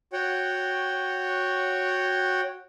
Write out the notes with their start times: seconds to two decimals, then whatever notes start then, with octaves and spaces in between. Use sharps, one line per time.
0.13 F#4 C#5 F#5 G5